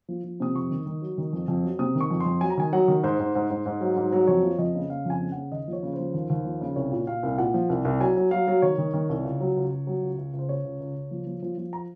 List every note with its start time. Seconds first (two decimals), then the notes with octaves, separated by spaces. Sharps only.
0.08 F3
0.24 F3
0.40 C3 D#6
0.55 F2 C#6
0.70 D#3
0.86 D#3
1.02 F#3
1.18 D#3
1.33 F2
1.48 F2
1.63 F#3
1.79 C3 D#6
1.95 D#3
2.00 C#6
2.10 F2
2.20 C6
2.25 F2
2.41 F#3 G#5
2.50 A#5
2.58 D#3 G#5
2.72 F#3 F#5
2.88 D#3
3.03 G#2 C5
3.19 G#2
3.35 G#2
3.50 G#2
3.66 G#2
3.81 F#3
3.97 G#2
4.12 F#3
4.27 F2 C#5
4.43 F3
4.59 F2 D#5
4.75 C#3
4.90 C#3 F5
5.05 F2 G#5
5.21 C#3
5.32 C#3 F#5
5.52 D#2 D#5
5.68 F3
5.73 C#5
5.83 C#3
5.93 C5
5.99 F3
6.14 D#2
6.30 D#2
6.45 F3
6.61 C#3
6.76 C2 C#5
6.92 A#2
7.07 A#2 F5
7.23 C2
7.38 A#2 F#5
7.54 F3
7.69 C2
7.85 C2
8.00 F#3 G#5
8.16 F#3
8.31 F#3 F5
8.48 F#3
8.62 D#3 C#5
8.78 D#3
8.93 D#3
9.09 C2
9.24 C#2
9.40 F#3
9.56 C#2
9.71 C#2
9.87 F#3
10.02 C#2
10.18 C#2
10.33 C#2
10.39 C5
10.49 C#3 C#5
10.64 C#2
10.80 C#2
10.96 C#2
11.11 F3
11.27 F3
11.42 F3
11.57 F3
11.73 A#5